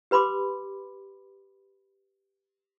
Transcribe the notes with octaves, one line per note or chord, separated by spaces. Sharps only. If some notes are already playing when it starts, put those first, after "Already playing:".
G4 B4 B5 C6 D6